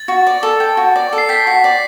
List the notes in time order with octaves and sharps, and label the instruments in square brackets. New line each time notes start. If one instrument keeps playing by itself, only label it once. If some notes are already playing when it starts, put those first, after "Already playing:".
Already playing: [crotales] A6
[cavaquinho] F#4
D5
A4
G5
F#4
D5
A4
[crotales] C7
[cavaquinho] G5 [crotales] B6
[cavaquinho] F#4
D5